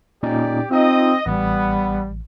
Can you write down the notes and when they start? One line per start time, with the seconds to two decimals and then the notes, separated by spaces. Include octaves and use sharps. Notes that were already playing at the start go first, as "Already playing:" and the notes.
0.23 A#2 C#4 D#4 G4 D5
0.71 C4 D#4 F4 D#5
1.26 A1 G3 B3